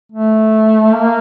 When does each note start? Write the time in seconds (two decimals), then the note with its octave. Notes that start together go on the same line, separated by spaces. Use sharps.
0.12 A3
0.93 A#3